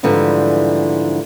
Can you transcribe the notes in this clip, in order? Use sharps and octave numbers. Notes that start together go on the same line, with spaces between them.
G#2 D3 E3 F3 G3